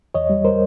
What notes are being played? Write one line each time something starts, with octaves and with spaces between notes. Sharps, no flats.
E2 C#5 D#5
G3
A#4 C5